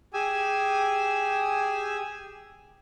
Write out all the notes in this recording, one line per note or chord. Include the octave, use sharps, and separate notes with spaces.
G4 G#4 G#5 E6